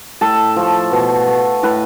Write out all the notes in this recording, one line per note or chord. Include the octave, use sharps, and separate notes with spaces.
A2 A4
F3 A3
B2
A3
A2 B4